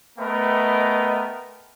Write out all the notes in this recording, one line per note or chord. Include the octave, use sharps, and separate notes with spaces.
A3 B3 A#4 B4 D#5 G5